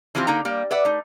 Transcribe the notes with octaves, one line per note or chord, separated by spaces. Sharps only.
E3 F3 C4 F4 G4
D3 A#3 D#4 A#5
G3 A#3
B4 D5 E5 F#5
A3 D#4